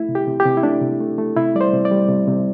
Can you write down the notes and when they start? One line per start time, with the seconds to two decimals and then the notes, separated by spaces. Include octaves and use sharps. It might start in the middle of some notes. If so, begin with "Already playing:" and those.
Already playing: A3 E4
0.09 C3
0.15 G4
0.27 C3
0.40 G4
0.45 C3
0.57 E4
0.63 A3 D4
0.82 C3
1.00 A3
1.18 A3
1.36 C3 E4
1.55 G3 D5
1.61 C5
1.73 C3
1.85 D5
1.91 G3
2.09 C3
2.28 C3